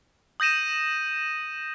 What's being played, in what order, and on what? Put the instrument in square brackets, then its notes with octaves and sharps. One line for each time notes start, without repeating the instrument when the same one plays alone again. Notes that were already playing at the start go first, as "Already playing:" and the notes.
[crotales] D#6 G6 A#6 D#7 E7